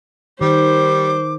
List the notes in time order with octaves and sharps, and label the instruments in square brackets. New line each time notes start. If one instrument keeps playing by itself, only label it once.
[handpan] D#3 [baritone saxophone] G3 [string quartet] C5 [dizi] D6